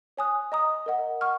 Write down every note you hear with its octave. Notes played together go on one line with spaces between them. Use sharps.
C#5 G#5 D#6 F#6
D#5 A#5 D#6
A#4 D#5 F#5
F#5 C#6 F6